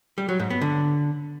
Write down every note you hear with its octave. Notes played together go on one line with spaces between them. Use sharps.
G3
F#3
G#2
B3
D3